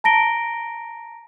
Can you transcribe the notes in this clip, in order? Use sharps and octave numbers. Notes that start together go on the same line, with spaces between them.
A5 A#5 A#6 D7 G7